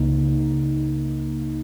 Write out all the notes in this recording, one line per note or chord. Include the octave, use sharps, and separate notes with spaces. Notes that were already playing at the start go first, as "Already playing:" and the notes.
Already playing: C#2 C#3 A#3 D#4